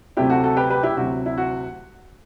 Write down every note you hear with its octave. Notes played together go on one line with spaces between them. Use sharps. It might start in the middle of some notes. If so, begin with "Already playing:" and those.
D2 C3 F#3 A3 C4 E4 G4
F#4 A4
F#4 A4
G4 B4
G4 B4
E4 G4
D2 C3 F#3 F#4
E4
F#4